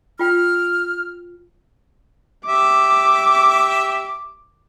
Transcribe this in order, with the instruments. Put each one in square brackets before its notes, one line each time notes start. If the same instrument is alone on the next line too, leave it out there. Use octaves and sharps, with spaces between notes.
[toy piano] F4 G5 [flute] F6
[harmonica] G4 E5 [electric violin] D6